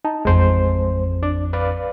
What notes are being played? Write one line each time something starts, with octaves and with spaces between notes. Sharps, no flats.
D#4 A5
A1 F2 G#3 C5
D4 D5
B4 D5 F5